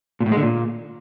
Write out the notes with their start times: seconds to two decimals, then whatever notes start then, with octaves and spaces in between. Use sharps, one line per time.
0.20 A#2
0.26 A2
0.31 G#3
0.37 D3
0.42 A#2